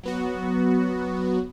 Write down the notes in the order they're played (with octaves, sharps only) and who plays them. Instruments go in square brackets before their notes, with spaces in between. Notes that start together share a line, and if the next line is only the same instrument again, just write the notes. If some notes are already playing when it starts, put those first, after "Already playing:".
[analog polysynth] F#3 B3 F#4